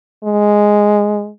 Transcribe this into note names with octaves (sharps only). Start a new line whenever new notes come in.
G#3